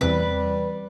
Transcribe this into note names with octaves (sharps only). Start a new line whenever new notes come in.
E2 C3 G3 B4 D5